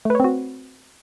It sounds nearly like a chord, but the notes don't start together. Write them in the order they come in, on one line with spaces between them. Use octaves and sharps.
A3 B4 C#5 C4 F#4